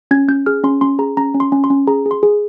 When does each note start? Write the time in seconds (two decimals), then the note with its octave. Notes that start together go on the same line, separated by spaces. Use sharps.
0.11 C#4 G#6
0.28 C#4 G6
0.46 G#4 F6
0.64 C#4 C6
0.81 C#4 C6
0.99 G#4 A#5
1.17 C#4 A#5
1.34 C#4
1.40 C6
1.52 C#4
1.64 C6
1.70 C#4
1.87 G#4 A#5
2.06 G#4
2.11 C6
2.23 G#4